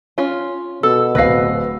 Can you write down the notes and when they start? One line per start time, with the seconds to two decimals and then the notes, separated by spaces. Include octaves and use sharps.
0.18 C#4 F4
0.83 B2 A4 E6
1.15 D1 B4 F5 A#6 C7